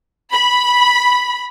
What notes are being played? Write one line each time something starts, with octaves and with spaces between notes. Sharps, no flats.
B5